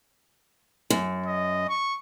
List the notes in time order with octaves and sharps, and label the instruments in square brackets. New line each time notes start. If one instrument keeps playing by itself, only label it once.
[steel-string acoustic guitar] F#2
[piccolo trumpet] D#5
C#6